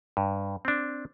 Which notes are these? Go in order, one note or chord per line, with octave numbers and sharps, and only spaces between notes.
G2
C4 D4